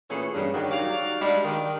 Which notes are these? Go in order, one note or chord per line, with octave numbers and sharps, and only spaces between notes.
A#2 E3 A3 B3 C#4 G#4
G2 C#3
D#3 F#3 G3
F#3 D#4 F#4 D5 F5
G3 G#3 D4
D#3